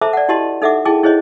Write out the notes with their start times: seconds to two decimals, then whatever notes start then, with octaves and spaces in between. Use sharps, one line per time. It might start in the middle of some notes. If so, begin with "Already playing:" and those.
0.01 A4 C5 E5 A5 A#5 D6
0.13 D5 F#5
0.28 E4 F#4 G4 D#5 A5 C6
0.62 D#4 A4 E5 F#5 D6
0.85 E4 G#4 G5 A5 D6
1.03 E4 G#4 C5 C#5 D#5